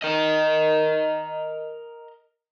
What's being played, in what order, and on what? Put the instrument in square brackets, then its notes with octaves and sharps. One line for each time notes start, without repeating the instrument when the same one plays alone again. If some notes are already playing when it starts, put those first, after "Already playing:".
[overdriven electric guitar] A#4 D#5